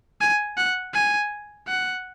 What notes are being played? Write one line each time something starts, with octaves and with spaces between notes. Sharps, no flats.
G#5
F#5
G#5
F#5